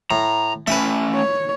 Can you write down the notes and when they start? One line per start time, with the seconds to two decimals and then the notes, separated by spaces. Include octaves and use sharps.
0.11 A2 A#5
0.67 A3 C#4 B4 E5
1.15 C#5